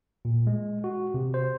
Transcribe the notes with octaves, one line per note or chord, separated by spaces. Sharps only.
A#2
G#3
F#4
C3
C5